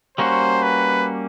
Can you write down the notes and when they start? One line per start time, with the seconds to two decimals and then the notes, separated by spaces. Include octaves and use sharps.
0.18 G3 A#3 C#4 F#4 C5
0.63 B4